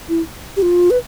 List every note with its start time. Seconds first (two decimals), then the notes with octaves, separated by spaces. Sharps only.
0.09 E4
0.57 G4
0.62 F4
0.91 B4